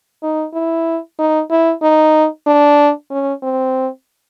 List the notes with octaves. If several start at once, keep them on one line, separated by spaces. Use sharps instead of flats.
D#4
E4
D#4
E4
D#4
D4
C#4
C4